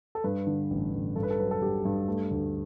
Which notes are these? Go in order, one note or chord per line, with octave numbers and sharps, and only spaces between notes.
A4
G2 B4
D3
A1
A1
G2 A4
B4
A4
F#3 B4
A4
G2 G4
G2
A3
D2